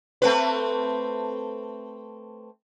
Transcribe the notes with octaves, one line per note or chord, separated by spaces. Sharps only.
A3 C4 B4